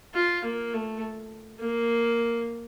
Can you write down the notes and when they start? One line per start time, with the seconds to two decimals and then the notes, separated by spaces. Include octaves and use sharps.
0.15 F4
0.44 A#3
0.73 A3
1.60 A#3